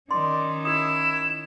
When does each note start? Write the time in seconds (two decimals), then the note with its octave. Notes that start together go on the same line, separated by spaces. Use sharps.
0.11 D#3 C#4 D5 C6
0.65 E4 G4 D#6 E7